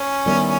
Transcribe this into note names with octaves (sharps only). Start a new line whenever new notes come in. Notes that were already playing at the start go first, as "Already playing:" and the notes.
Already playing: C#4
D#3 G3 B3 E4